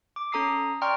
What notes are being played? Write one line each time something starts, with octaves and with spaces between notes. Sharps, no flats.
D6
C#4 A4 A#5 D#6 C7
D5 G5 A#5 C6 C#6 F6